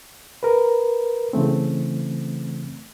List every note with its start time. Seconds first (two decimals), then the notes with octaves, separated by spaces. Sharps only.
0.43 A#4 B4
1.33 C#3 E3 A3 C4